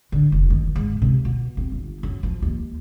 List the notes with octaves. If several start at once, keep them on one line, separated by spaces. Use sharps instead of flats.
D3
F1
D#3
G#2
C3
B2
C4
G1
F#2
F3
D#2